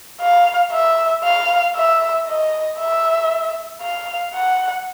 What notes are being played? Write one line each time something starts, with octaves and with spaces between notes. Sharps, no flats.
F5
E5
F5
E5
D#5
E5
F5
F#5